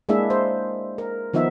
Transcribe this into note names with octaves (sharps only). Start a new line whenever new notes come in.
G#3 A#3 D4 E4 G#4 E5
C5
A#4
D#3 F3 B3 D#4 E5